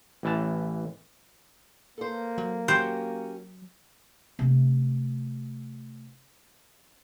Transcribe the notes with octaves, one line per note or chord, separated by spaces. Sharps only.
A1 E3 A5
A#3 A4 C5
F#3
C#4 F#4 G4 C5
C3 A3